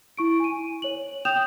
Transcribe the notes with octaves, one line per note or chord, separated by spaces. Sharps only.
E4 C#6 D7
G#5 D#7
C#5 F#7
G5 D#6 G6 E7 F7